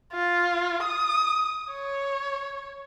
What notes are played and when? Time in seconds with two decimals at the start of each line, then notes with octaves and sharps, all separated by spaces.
0.13 F4
0.83 D#6
1.72 C#5